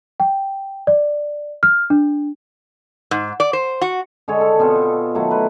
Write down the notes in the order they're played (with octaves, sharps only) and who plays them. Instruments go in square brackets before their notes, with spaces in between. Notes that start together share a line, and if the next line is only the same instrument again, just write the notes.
[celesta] G5
D5
F6
D4
[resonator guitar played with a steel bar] G#2
D5
C5
F#4
[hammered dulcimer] D3 G#3 A4 C#5
A4
B2 B3 C4 F4
C#6
D#3 F#3 A3
B4